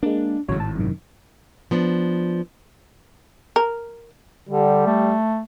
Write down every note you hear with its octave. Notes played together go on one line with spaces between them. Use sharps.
G#3 A#3 D4
G#1 A2 C#3 F#3 C#5
A5
F#2 C3 D#3
F3 B3 D4
A#4
D3 G3
A3